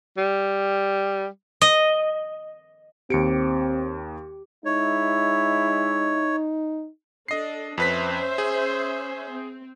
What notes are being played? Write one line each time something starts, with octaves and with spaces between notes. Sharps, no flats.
G3
D#5
D#2 C4 G4 C#7 D7
G#3 D#4 E4 C#5
D4 A4 D#5 C7
F2 C#4 B4 C5 E5 B6
G#4
C4